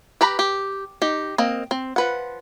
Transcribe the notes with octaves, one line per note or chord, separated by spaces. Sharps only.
G4 B4 A#5 B5
G4
D#4 G4
A#3 C4 D#5
C4
F3 B4 F#5